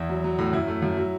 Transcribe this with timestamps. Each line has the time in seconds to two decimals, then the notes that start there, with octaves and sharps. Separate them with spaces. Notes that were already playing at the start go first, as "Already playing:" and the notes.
Already playing: E2 E4
0.09 F#3
0.24 F#3
0.39 A2
0.53 F#2 E4
0.68 A3
0.82 F#2
0.97 F#3